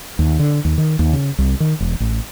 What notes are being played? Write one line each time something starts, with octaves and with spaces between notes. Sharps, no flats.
D#2
D3
D#2
D#3
D#2
C#3
C2
D#3
E1
A1